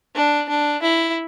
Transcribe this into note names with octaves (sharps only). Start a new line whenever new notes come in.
D4
D4
E4